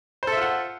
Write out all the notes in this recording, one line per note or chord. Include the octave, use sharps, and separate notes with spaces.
F4 A4 C5 E5 F#5